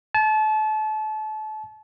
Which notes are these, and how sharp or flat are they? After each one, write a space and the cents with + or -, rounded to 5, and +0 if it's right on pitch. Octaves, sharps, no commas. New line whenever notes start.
A5 -30